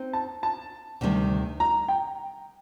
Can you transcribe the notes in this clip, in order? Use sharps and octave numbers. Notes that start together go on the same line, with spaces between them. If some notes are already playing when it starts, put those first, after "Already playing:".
Already playing: C4 D#4
A5
A5
D2 C3 D#3 G3
A#5
G5